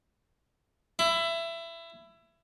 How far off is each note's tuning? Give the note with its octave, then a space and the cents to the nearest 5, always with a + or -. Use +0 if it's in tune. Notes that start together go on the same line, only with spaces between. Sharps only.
E4 +20